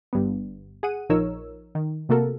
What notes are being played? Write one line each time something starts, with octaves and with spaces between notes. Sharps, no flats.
G1 G2 B3
G#4 F#5 D#7
A#1 F3 D#4 A#4 C#5 E6
D#3
C3 A3 A#3 F#4 A4 A#4